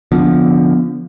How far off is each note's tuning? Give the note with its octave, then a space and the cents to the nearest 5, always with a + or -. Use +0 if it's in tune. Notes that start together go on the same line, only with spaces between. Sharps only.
D3 -20 F3 +0 B3 -5